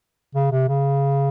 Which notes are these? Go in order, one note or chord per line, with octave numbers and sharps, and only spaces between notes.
C#3
C3
C#3